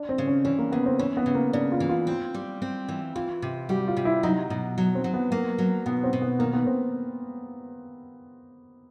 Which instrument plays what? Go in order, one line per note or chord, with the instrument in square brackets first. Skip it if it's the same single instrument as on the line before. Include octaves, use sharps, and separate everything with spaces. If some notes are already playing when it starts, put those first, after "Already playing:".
Already playing: [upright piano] D4
C4
[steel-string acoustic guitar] C#3
[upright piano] C#4
[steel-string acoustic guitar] E3 [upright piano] C#4
[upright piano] A#3
[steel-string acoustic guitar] C#3 [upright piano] B3
[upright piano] C4
[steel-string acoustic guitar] E3 [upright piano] C#4
[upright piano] B3
[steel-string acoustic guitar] C#3
[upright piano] A#3
[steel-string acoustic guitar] C#3 [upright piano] D4
[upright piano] F4
[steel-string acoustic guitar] E3
[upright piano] F4
[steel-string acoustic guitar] C4
G3
C4
E3
[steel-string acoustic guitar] E3 [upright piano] F4
[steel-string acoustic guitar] C3
[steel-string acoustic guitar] G3 [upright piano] F#4
[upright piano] F4
[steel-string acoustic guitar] C3
[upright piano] E4
[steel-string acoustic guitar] F#3 [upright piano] D#4
[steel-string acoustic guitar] B2
F#3
[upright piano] C4
[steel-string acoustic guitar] F#3
[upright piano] B3
[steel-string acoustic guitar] A#3 [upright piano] B3
[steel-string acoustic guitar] F#3
[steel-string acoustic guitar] B2 [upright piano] B3
[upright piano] C4
[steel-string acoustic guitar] B2
[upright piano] B3
[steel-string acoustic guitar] D#3 [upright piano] A#3
[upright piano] B3
C4